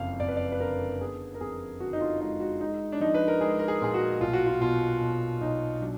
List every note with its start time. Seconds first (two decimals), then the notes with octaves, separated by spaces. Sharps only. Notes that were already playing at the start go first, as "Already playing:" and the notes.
Already playing: F#1 F2 F5
0.20 F2 D5
0.28 B4
0.37 D5
0.52 B4
0.60 D3 A#4
1.01 B3 G#4
1.34 A#4
1.41 F2 G#4
1.80 D3 F#4
1.93 D#4
2.01 F4
2.20 G#3 D#4
2.40 F#4
2.61 G#3 D#4
2.92 D4
3.00 F3 D#4
3.14 B4
3.28 A#4
3.41 G#3 G#4
3.59 A#4
3.68 G#4
3.81 A#2 G#4
3.94 F#4
4.21 B1 F4
4.33 F#4
4.46 F4
4.61 B2 F4
5.01 B1
5.41 B1 D#4
5.81 F#3 D4